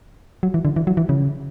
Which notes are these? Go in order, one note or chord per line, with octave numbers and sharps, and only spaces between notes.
F#3
E3
D3
E3
F#3
E3
C#3